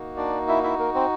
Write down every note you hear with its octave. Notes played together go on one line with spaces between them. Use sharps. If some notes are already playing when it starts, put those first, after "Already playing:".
Already playing: A#3 D#4 F#4
D4 D5
E4 E5
E4 E5
A#3 A#4
C4 C5